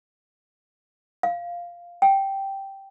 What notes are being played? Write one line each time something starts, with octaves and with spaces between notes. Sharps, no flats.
F5
G5